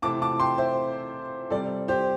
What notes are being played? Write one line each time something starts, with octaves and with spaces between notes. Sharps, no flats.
C3 E3 A3 C4 E4 A5 D6
A5 D6
G5 C6
C5 E5
C3 G3 C4 A4 D5
G4 C5